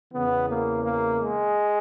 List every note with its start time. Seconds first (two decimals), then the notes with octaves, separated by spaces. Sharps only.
0.13 E2 C#3 E3 B3
0.48 A#3
0.83 A#3
1.18 G#3